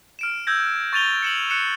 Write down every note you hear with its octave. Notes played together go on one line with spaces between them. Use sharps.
F6 D7 E7
E6 G6 G#6 A#6
C#6 A6 D#7 F7 G7
C#7 E7 F#7
F#6 C#7 E7